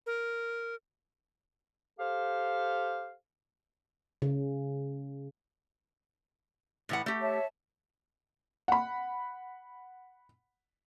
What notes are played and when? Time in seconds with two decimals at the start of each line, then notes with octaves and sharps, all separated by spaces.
0.06 A#4
1.99 G4 A4 C5 F5
4.22 C#3
6.89 A2 E3 F#5
7.06 A3 G4
7.21 C#5 E5 A5
8.68 F#5 B5